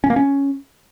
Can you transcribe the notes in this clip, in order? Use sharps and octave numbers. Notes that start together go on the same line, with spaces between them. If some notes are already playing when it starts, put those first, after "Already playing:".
C#4
A#3
C#4